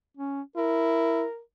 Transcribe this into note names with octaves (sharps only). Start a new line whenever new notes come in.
C#4
E4 A#4